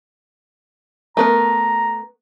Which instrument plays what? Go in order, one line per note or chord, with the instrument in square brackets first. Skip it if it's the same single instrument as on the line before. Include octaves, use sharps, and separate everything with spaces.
[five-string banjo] A3 B3 A#4 [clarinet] A#5